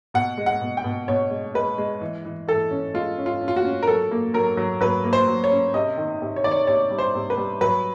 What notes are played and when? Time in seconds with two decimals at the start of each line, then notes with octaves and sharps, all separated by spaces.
0.14 B2 F#5
0.37 G#3
0.46 F#5
0.61 B2
0.77 G5
0.84 B2
1.08 B2 C#5
1.31 G#3
1.54 G#3 B4
1.78 G#3
2.01 E3
2.25 E3
2.48 E3 A4
2.71 C#4
2.94 G#3 F4
3.18 C#4
3.26 F4
3.41 C#4
3.48 F4
3.56 F#4
3.65 C#4
3.83 A#4
3.87 F#3 A4
4.11 A#3
4.34 F#3 A#4
4.57 F#3
4.81 F#3 B4
5.04 A#3
5.13 C5
5.28 F#3
5.44 C#5
5.51 C#4
5.74 C3 D#5
5.97 D#3
6.22 C3
6.36 C#5
6.44 D#3 D5
6.51 C#5
6.67 C3 C#5
6.91 G3
6.99 C5
7.15 C3
7.30 B4
7.37 G3
7.61 F#3 B4